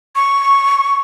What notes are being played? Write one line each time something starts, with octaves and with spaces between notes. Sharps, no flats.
C#6